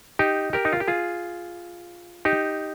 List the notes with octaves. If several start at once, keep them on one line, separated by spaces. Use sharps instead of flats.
D#4 G4
G4 A#4
D#4
F4
G4
F4 G#4
D#4 G4